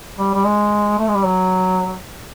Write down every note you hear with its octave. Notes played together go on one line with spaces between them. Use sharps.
G3
G3
G#3
A3
G#3
G3
F#3